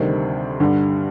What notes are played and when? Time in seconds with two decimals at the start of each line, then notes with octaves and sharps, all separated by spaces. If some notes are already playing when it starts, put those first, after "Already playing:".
Already playing: D2 C3 D#3 G3 C4
0.60 G2 D3 G3